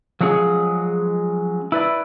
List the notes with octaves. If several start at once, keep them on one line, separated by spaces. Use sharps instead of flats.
F3 F#3 G#3 C#4 G#4
E4 B4 D5